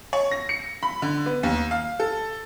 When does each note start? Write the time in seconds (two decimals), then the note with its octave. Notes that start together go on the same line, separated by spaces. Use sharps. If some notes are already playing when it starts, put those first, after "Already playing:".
0.13 C#5
0.31 A#6
0.49 C#7
0.83 B5
1.02 D3
1.26 B3
1.43 D#2
1.71 F5
2.00 A4